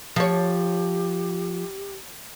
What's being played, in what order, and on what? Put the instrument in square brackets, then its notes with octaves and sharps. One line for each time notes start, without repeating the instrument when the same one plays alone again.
[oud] F3 C#5 [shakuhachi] G4